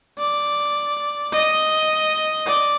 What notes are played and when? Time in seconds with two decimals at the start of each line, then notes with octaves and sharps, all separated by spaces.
0.19 D5
1.33 D#5
2.47 D5